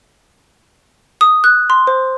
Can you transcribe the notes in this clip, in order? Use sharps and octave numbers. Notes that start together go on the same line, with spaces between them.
D#6
F#6
C6
C5